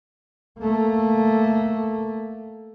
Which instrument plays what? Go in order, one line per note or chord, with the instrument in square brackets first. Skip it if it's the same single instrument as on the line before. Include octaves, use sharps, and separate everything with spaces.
[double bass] A3 A#3